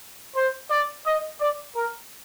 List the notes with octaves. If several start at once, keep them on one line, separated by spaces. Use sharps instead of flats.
C5
D5
D#5
D5
A#4